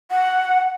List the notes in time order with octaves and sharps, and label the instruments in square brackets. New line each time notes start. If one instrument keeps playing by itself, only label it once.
[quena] F#5